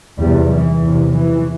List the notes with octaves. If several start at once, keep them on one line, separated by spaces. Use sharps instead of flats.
E2 C3 G3
E3
E2 C3
E3